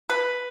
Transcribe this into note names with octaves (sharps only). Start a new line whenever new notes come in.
B4